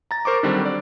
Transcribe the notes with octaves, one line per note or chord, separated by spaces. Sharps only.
A#5 A6
A#4 C5 C#6 D6
D3 D#3 F#3 G3 C4 D4
D5